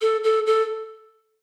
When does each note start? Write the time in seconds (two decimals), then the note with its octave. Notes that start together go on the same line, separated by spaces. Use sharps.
0.01 A4
0.24 A4
0.47 A4